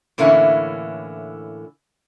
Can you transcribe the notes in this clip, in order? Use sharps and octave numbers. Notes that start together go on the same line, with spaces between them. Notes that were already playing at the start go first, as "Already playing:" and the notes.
A2 D3 E3 A#3 C#4 E4